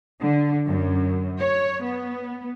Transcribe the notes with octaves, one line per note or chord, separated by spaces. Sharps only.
D3
F#2
C#5
B3